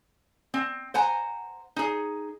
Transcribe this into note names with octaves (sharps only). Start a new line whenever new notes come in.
C4
C5 F#5 G#5 A#5
D#4 G#4